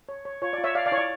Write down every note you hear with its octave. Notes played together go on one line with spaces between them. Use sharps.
C#5
C#5
F4 C#5
D5
F4
C#5 E5
C#5 D5 F5
D5 F5
E4 C#5
D5